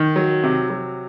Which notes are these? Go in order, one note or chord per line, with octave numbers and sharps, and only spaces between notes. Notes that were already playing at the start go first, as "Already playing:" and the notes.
Already playing: D#3
F#3
C3
F#3